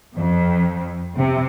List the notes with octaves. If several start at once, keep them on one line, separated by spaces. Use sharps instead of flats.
F2
C3